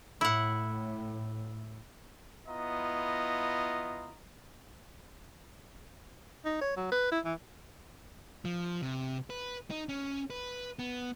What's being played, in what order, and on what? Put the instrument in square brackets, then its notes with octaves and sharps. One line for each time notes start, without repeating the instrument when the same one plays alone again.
[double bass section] A2 [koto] E4 F#5
[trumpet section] B3 E4 F4 D#5 A#5
[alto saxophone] D#4
C#5
F#3
B4
E4
E3
[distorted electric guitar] F3
C3
B4
D#4
C#4
B4
B3